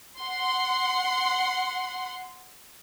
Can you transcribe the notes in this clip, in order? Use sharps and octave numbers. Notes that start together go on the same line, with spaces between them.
F#5 C6